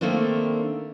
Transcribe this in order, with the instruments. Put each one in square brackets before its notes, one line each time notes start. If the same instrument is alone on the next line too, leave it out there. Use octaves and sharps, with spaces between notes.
[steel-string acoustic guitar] D#3 A3 A#3 C4 D4